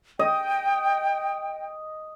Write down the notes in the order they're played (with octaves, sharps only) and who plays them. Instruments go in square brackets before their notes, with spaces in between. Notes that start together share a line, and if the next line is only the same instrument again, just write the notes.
[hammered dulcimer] D#5 [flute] G5